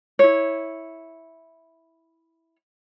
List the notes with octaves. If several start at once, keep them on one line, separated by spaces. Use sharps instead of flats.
E4 C#5